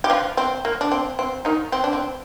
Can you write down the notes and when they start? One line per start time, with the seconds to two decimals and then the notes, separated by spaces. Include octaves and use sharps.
0.04 G4
0.10 F3 F4
0.37 C4
0.65 A#3
0.81 D4
0.92 C4
1.19 C4
1.45 D#3 D#4
1.72 C4
1.84 D4
1.93 C4